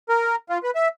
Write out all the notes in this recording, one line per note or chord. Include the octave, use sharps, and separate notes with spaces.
A#4
F4
B4
E5